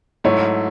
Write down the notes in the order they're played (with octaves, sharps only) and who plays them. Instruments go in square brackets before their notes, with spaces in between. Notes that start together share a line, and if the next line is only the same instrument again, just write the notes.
[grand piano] G#2 F#3 A3 E4 [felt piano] C#5